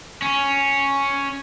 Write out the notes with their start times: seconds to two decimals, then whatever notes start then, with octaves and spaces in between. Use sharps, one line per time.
0.22 C#4